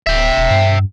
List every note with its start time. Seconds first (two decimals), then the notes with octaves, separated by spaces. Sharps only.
0.07 D1 E5 G5
0.37 D#1
0.50 G2